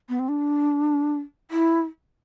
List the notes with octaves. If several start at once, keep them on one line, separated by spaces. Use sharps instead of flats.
B3
C4
D4
E4